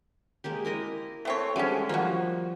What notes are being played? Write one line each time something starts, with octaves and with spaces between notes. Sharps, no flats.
G#3 A#3 G4
E4 A#4 D#5
A3 C4 C#5
D3 G3 G#3 C#4 G4
F3 G3 A#3 F#4